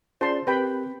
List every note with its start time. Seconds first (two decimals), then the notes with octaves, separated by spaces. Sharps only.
0.21 C#4 F4 G#4 C5 D5 A5 C6
0.47 C4 G4 A#4 B4 G5 B5